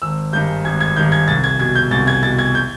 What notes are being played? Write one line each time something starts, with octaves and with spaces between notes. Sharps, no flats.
G#1 E6
G2 D#3 G6
G#1 G#6
G#6
G2 D#3 G6
G#6
C2 A6
G#6
B2 G#6
G6
C2 A6
G#6
B2 A6
G#6
G6